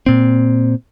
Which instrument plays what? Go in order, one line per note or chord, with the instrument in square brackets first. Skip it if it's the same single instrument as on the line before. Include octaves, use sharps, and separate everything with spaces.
[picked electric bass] A#2 C4